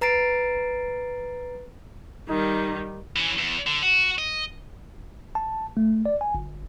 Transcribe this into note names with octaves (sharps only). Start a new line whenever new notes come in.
B4 A#5 A6 C7 D7
D#3 G3 D#4
E3 C#4
E2
D3
F#4
D#5
A5
A3
D5
G#5
G1